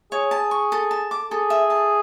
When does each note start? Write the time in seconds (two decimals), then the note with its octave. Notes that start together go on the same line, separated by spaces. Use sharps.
0.12 G#4 C#5
0.31 A5
0.51 C#6
0.72 A4
0.91 A5
1.11 D6
1.31 G#4 A4
1.50 E5
1.70 A5